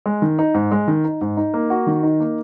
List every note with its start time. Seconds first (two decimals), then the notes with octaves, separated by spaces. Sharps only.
0.06 G#3
0.22 D#3
0.39 D#4
0.54 G#2
0.72 G#3
0.88 D#3
1.04 D#4
1.21 G#2
1.37 D#4
1.54 A#3
1.70 F#4
1.87 D#3
2.03 D#4
2.20 A#3